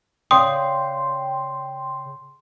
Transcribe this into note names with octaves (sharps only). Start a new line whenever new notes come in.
C#3 D5 G5 C6 D#6